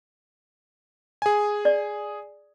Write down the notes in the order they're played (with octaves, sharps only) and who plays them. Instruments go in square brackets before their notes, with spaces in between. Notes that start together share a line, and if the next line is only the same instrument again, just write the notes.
[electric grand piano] G#4 G#5
[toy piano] D5